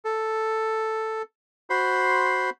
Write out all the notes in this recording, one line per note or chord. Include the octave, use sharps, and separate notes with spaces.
A4
F#4 C5 B5 C6